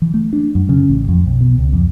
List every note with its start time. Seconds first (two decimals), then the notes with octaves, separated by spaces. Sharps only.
0.02 E3
0.14 A3
0.33 D4
0.55 F#2
0.69 C#3
0.90 A1
1.09 F2
1.26 B1
1.41 B2
1.58 C#2
1.73 F2